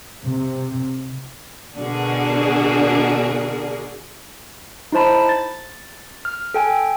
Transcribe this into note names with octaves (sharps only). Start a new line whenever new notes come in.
C3
B2 D3 D4 F#4 G#4 A#4
D#4 E4 C5 A5 B5
A6
F6
A4 G5 G#5